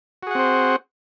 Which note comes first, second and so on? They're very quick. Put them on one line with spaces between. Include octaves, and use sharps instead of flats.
F#4 G#4 F#5 C4 C5